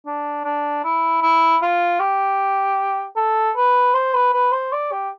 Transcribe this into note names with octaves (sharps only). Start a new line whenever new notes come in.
D4
D4
E4
E4
F4
G4
A4
B4
C5
B4
B4
C5
D5
G4